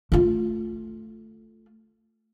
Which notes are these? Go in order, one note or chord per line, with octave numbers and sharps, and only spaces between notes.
A3 F4